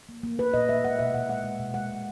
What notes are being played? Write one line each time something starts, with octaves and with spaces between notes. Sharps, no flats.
A#3
A#3
A#3 B4
A#2 D#5
A#3 E5
G#3 F#5
B2 E5
B2 F#5
G#3 F#5
G#3
B2
G#3 F#5
B2